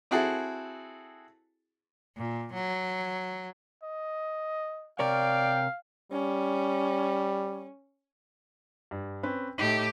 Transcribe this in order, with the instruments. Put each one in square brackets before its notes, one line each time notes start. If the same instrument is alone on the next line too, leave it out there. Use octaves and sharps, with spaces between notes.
[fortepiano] C4 E4 F#4 G#4 A4
[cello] A#2
F#3
[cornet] D#5
[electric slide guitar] C3 A#4 C#5 [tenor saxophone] D5 [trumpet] F5 [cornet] G5
[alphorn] G3 [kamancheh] C#4
[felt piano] G2
C4 C#4 B4
[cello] A2 G4 [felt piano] D#4